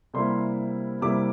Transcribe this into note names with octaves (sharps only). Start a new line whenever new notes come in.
C3 G3 A#3 E4 C6
C3 G3 A#3 E4 D6